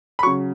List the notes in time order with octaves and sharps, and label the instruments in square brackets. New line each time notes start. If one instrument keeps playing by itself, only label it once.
[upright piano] B5
C#3 F#3 C#6